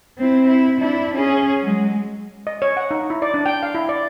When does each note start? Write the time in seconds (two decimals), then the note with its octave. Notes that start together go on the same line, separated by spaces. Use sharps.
0.18 C4 E4
0.48 E4
0.78 D4 E4
1.14 C#4 G#4
1.62 F#3 G#3
2.47 D#5
2.62 C#5
2.77 F#5
2.91 D#4
3.10 E4
3.22 D5
3.34 D4
3.46 G5
3.63 F5
3.75 E4
3.89 D5